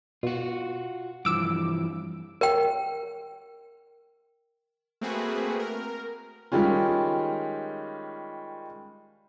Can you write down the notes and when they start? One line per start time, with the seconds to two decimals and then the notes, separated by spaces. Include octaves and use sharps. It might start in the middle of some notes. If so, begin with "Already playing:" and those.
0.23 B2 F4 F#4
1.25 G2 E3 F3 D6 E6 D7
2.41 A#4 G5
5.01 A3 A#3 C4 F#4 G#4 B4
5.60 A#4
6.52 D#3 G3 G#3 C#4 F4